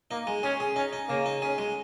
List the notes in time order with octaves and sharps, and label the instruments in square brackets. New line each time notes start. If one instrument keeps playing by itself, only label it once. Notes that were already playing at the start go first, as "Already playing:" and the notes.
[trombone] A#3 [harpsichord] D#4
[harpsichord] G#3
[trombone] C#4 [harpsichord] G#4
[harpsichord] G#4
[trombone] C#4 [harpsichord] D#4
[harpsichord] D#4
[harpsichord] C#3 [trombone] A#3
[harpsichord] D#4
[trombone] C#4 [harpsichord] G#4
[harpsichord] G#3